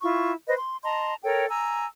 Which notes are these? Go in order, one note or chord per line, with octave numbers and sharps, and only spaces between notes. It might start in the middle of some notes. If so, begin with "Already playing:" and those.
E4 F4 C#6
B4 C5 D#5
C6
D#5 A5 A#5 C6
A4 A#4 C#5 G5
G#5 A#5 E6